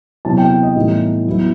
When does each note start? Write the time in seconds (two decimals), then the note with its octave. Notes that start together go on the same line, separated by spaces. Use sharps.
0.25 C3 F#3 B3 E4 A5
0.38 G5
0.63 D#5
0.76 A2 E3 G3 B3 D#4
1.27 F#3 B3 E4